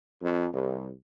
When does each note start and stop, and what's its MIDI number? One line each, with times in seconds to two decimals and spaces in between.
0.22 0.47 41
0.52 0.89 36